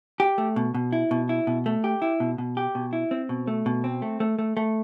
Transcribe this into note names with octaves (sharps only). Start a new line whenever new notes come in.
G4
A3
B2
B2
E4
B2
E4
B2
A3
G4
E4
B2
B2
G4
B2
E4
C4
B2
A3
B2
C4
A3
A3
A3
A3